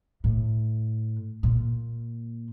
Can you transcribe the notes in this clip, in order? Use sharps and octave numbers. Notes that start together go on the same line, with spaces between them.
A2
A#2